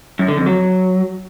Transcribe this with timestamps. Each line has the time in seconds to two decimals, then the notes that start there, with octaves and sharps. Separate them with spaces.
0.19 F#2
0.28 D3
0.37 F2
0.46 F#3